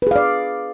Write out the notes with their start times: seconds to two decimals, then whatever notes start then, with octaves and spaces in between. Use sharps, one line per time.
0.02 B4
0.07 G#4
0.11 F5
0.16 D5